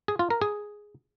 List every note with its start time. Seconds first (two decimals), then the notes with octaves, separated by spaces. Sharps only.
0.08 G#4
0.19 F4
0.30 A#4
0.42 G#4